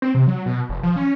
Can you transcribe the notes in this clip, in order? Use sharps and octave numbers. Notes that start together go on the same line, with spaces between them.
C4
C3
F#3
B2
F1
F3
C#4